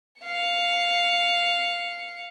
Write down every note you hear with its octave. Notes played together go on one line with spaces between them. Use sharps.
F5 C#7